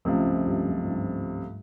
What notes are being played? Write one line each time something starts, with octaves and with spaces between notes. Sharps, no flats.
C#2 F#2 C3 F3 A3
G2
G2
F#2
G#2
G2